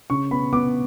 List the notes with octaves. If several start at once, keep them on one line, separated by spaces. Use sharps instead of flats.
C#3 C#6
B3 B5
B3 D6